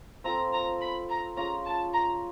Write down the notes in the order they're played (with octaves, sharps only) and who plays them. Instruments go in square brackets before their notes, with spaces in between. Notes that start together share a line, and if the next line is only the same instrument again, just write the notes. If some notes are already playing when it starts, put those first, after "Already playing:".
[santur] C4 F4 A4 C5 [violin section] A#5
[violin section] A#5
B5
A#5
[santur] C#4 F4 G#4 [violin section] A#5
[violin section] A5
A#5